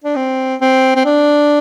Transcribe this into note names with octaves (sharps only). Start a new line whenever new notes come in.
D4
C4
C4
C4
D4